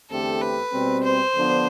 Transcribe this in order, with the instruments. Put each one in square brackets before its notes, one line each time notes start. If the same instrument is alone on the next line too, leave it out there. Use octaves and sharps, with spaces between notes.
[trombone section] E2 D3 A3 C4 G4 [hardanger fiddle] A4
[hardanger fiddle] B4
[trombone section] B2 G3 C4
[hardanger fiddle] C5
[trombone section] D3 F3 B3 D4